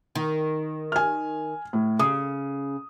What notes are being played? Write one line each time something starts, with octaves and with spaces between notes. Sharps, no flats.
D#3
G#5 F6
A2
C#3 D#6